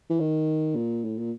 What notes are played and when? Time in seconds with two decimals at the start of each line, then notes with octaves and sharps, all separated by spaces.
0.10 E3
0.20 D#3
0.76 A#2
1.04 A2
1.18 A#2